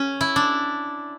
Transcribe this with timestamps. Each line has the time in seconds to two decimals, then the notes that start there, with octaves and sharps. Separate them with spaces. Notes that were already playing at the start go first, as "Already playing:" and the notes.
Already playing: C#4
0.21 E4
0.36 D4